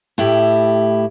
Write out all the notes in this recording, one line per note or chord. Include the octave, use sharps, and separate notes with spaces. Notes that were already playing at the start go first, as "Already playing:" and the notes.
A2 E4 G4